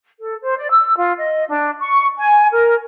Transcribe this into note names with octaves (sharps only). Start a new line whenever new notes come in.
A4
C5
D5
E6
F4
D#5
D4
C#6
G#5
A#4